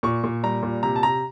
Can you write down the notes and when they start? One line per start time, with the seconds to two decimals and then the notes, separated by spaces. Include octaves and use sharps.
0.03 A#2 C#6
0.24 A#2
0.43 G3 A#5
0.63 A#2
0.83 C3 A#5
0.96 A5
1.03 C3 A#5